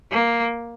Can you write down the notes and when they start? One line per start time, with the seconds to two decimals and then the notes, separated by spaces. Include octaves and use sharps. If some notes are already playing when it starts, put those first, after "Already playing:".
0.11 A#3